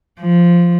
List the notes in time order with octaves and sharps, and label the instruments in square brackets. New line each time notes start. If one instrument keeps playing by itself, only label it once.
[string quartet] F3